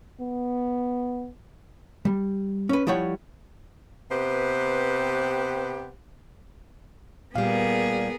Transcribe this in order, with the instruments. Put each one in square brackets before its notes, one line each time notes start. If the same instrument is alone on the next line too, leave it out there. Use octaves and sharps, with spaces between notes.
[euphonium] B3
[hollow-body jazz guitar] G3
C#4 B4
F3 G3 E4 C#5 F#5 G5
[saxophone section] C3 B3 G4 B4 C5
[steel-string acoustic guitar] A#2 G3 [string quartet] B3 G#4 A#4 [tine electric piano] F5